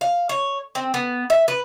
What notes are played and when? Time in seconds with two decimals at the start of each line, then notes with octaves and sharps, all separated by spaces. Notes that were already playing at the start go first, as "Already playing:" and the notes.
0.01 F5
0.29 C#5
0.75 C4
0.94 B3
1.30 E5
1.48 B4